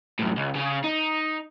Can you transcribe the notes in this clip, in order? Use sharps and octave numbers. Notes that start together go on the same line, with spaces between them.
F#2 A2
C#2
C#3 C#4
D#4